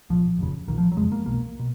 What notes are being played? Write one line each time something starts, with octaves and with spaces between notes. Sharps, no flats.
B1 A#2 F3
F1 D#2 C#3
B1 A#2 D#3
F3
F#3
F#1 F2 C#3 G#3
A#3
B1 B2 A#3
B2